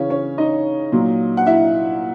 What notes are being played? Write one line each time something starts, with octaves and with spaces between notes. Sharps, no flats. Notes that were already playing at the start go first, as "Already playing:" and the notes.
Already playing: C#3 E3 C#4 C#5
C#4 C#5
D#4 D#5
A#2 F#3
F#5
E4 E5